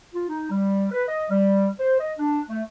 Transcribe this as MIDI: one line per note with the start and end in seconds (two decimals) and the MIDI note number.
0.14 0.24 65
0.29 0.48 63
0.51 0.86 55
0.92 1.03 71
1.08 1.25 75
1.30 1.68 55
1.79 1.97 72
1.99 2.13 75
2.19 2.40 62
2.49 2.62 57